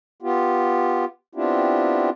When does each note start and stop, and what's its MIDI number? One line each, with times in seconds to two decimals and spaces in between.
0.22 1.05 59
0.22 1.05 65
0.22 1.05 67
1.35 2.10 59
1.35 2.10 60
1.35 2.10 62
1.35 2.10 64
1.35 2.10 65
1.35 2.10 67